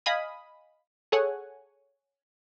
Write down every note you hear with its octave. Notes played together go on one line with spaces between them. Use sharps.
D#5 F5 G#5 B5 D#6
G#4 A4 C#5 F#5 G#5